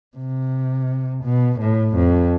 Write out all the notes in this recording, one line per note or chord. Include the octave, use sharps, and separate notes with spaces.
C3
B2
A2
F2